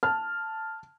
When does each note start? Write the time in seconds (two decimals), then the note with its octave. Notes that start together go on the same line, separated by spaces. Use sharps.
0.03 A5 F6